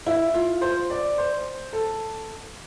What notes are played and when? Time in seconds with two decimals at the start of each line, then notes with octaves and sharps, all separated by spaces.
0.07 E4
0.34 F4
0.61 C5
0.90 D5
1.18 C5
1.73 A4